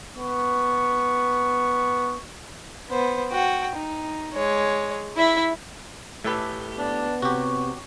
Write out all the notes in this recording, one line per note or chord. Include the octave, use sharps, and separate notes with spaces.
B3 C#6
B3 C5
F#4 G5
D#4
G#3 C#5
E4 E5
A2 A3 G4 A4 B4
B3 D4
C3 F#4 G4 C#5